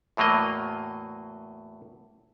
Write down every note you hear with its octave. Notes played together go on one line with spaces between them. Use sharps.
E2 A2 F#3 A#3 D#5